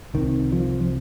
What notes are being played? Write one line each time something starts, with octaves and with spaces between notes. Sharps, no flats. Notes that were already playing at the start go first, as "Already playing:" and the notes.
C2 C3 D#3
F3
F3